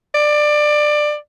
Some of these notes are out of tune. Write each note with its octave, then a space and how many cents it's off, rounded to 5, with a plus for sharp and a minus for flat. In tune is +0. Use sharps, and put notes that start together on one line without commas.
D5 +20